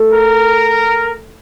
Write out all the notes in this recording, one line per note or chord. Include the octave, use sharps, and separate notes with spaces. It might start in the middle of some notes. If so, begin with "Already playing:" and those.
Already playing: A3
A#4